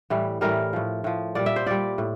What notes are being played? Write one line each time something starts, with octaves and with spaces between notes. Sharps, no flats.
A2 E3 G3
A2 E3 G3 A#4
A2 F3
A2 F3
A#2 G3 D5
E5
C5
A#2 G3 D5
A2